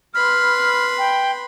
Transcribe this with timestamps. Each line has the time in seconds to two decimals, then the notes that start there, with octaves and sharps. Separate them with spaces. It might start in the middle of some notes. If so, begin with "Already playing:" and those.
0.14 B4 B5 C6 F6
0.98 G5